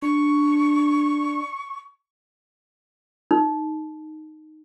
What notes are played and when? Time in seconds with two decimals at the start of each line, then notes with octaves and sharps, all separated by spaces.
0.02 D4 C#6
3.31 D#4